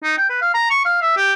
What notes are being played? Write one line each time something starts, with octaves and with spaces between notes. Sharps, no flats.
D#4
G5
B4
F5
A#5
C#6
F5
E5
G4